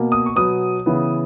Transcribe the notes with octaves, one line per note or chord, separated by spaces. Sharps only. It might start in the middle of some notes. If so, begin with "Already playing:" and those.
Already playing: B2 A#3
D#6
C#6
B2 F#3 B3 D#6
C#3 E3 B3